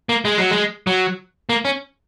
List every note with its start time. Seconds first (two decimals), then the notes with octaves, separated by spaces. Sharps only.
0.09 A#3
0.25 G#3
0.38 F#3
0.51 G#3
0.87 F#3
1.49 A#3
1.65 C#4